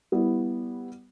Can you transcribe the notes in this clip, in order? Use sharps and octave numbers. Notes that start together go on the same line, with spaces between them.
G3 B3 E4